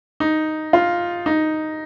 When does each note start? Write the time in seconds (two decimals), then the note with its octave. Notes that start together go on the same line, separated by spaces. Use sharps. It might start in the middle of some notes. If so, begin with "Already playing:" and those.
0.20 D#4
0.73 F4
1.26 D#4